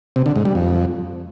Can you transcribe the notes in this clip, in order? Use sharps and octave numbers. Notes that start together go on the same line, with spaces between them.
C3
D3
G#2
G3
F2